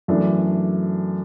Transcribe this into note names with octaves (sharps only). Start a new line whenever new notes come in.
F#2 E3 A3 D4